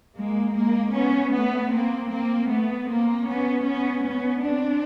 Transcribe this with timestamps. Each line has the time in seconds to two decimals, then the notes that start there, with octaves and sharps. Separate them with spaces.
0.17 G#3 A#3
0.56 G#3 A#3
0.95 B3 C#4
1.34 A3 B3
1.72 A#3 C4
2.11 A#3 C4
2.50 A3 B3
2.88 A#3 C4
3.27 B3 C#4
3.65 B3 C#4
4.05 B3 C#4
4.44 C4 D4